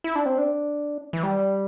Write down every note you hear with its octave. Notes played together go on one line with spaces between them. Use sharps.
E4
D4
C4
D4
E3
G3